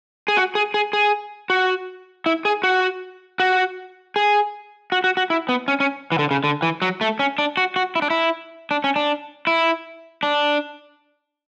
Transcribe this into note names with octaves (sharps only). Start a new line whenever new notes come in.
G#4
F#4
G#4
G#4
G#4
F#4
E4
G#4
F#4
F#4
G#4
F#4
F#4
F#4
E4
B3
C#4
C#4
E3
D3
C#3
D3
E3
F#3
A3
C#4
D4
F#4
F#4
E4
D4
E4
D4
C#4
D4
E4
D4